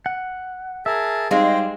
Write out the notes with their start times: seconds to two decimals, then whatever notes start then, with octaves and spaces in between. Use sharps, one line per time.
0.06 F#5
0.86 G#4 A#4 E5 A5
1.31 G3 G#3 C4 D#4 C5 F5 G5